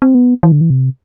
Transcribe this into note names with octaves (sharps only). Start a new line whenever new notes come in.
C4
B3
E3
D3
E3
C3